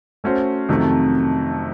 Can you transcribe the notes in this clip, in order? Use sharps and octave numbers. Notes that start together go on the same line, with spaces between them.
A3 C#4 F#4 C5
F2 C3 D#3 F#3 A3